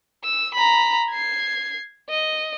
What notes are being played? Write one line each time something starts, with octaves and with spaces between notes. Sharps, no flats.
E6
A#5 B5
G#6 C7
D#5